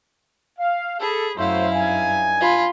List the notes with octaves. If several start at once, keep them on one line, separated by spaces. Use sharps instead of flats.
F5
G#4 A4 B5
F#2 F#3 A3 E4 C5 F5
G2 D#4 G#5
F4 B5